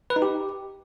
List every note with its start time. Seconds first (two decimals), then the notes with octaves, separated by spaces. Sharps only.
0.10 B4
0.16 D#4
0.22 G4